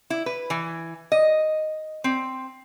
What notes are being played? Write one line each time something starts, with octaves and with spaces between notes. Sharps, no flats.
E4
B4
E3
D#5
C4